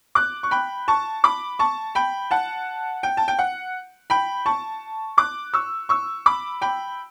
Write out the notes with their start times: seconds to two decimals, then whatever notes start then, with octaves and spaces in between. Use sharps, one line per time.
0.15 D6 F#6
0.43 C#6
0.51 G5 B5
0.88 A5 C#6
1.24 B5 D6
1.59 A5 C#6
1.95 G5 B5
2.31 F#5 A5
3.03 G5
3.17 A5
3.28 G5
3.39 F#5
4.10 G5 B5
4.46 A5 C#6
5.18 D6 F#6
5.54 C#6 E6
5.89 C#6 E6
6.26 B5 D6
6.62 G5 B5